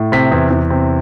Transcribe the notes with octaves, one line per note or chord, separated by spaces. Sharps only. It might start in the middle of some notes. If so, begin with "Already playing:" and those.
Already playing: A2
C3 B6
E2
E2
C3